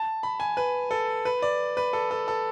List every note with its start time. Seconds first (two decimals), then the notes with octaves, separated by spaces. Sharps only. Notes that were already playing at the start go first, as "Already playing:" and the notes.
Already playing: A5
0.23 B5
0.40 G#5
0.57 B4
0.91 A4
1.25 B4
1.42 D5
1.77 B4
1.93 A4
2.11 A4
2.28 A4